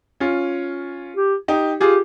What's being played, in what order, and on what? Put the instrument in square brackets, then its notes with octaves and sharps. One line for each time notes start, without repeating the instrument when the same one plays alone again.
[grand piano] C#4 F4
[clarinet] G4
[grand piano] D#4 G4
[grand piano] F4 G#4 [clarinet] G4